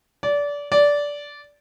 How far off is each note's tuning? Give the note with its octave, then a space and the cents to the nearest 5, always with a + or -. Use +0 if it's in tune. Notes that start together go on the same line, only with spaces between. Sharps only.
D5 -25
D5 -15